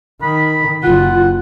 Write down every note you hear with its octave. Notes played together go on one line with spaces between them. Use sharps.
D#3 B5
F#1 F4 F#5